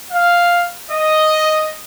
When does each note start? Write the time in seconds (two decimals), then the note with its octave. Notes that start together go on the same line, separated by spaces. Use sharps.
0.11 F5
0.90 D#5